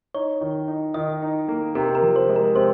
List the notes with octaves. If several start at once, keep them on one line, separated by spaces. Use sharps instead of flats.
D#4 C#5
D#3
D#4
D#3 D#5
D#4
A#3
C3 A#4
A#4
F3
C5
G#3
A#4
C3 C5